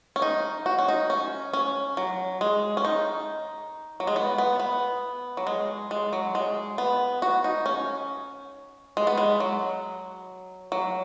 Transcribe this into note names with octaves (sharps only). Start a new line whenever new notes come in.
C#4
D#4
F#4
C#4
D#4
C#4
C#4
F#3
G#3
C#4
D#4
F#3
G#3
B3
B3
B3
F#3
G#3
G#3
F#3
G#3
B3
F#4
D#4
C#4
G#3
B3
G#3
F#3
F#3